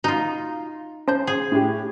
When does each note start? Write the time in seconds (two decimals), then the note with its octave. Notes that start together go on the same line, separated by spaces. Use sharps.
0.04 D#4 F4 F#4 A#5
1.08 C#4 C5 A5 G6
1.27 G#4
1.52 A2 G4